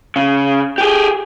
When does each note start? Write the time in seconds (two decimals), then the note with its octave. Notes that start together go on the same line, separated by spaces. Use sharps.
0.16 C#3
0.78 G4 G#4